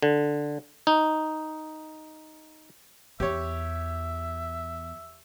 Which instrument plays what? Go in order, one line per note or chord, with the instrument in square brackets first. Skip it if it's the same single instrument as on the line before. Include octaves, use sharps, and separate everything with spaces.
[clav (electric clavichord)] D3
D#4
[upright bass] E2 [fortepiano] G4 C#5 [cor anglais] E5